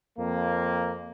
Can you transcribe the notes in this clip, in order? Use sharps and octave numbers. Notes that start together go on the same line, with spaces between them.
F2 A#3